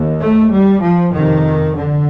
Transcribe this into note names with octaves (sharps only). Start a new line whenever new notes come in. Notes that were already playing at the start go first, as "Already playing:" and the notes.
Already playing: D#2
A3
G3
F3
F2 C3 D#3
D3